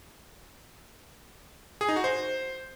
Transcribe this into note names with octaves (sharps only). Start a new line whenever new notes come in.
G#4
D#4
F#4
C5